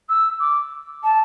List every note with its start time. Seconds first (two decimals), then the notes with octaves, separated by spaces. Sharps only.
0.09 E6
0.40 D6
1.03 A5